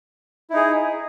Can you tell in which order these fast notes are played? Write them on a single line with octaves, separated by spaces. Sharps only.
E4 D#4 G#4